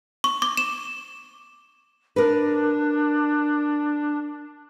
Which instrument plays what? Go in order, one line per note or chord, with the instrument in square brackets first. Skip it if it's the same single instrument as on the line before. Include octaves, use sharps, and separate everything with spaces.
[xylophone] C#6
D6
E7
[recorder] D4 [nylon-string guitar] A#4 B4